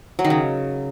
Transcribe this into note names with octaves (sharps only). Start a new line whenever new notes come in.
F#3
D#3
C#3